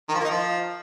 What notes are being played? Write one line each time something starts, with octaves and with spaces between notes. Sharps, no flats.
D#3
F3
A#3
D#4
F3